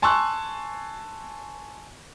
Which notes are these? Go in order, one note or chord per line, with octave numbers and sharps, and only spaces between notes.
G#5 A5 C6 C#6 E6 F#6